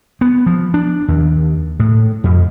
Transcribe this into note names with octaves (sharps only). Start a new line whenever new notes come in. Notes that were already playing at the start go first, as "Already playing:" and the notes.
B3
F3
D4
D#2
A2
F2